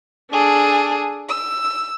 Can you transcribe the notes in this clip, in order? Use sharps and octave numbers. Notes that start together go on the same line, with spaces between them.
D4 G#4 A4
E6